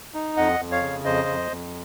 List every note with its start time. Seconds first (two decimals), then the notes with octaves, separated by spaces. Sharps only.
0.14 D#4
0.37 F2 D#5 F#5
0.59 F2
0.71 C#5 F5
0.82 C#3
1.05 F2 C5 D#5
1.28 F2
1.51 F2